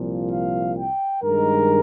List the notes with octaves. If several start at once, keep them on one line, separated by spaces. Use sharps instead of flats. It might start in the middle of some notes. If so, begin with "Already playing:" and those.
Already playing: C2 A#2 F3
F5
G5
G2 D#3 G#3 A#4